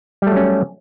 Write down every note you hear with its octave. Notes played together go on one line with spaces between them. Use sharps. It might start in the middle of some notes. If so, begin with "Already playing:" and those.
F#3 G3 A3 C#4